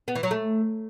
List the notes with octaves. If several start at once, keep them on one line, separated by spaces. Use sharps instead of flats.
B3
E3
F#3
A3